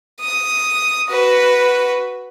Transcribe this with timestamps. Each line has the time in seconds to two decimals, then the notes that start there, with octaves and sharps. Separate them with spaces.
0.20 D#6
1.10 F#4 B4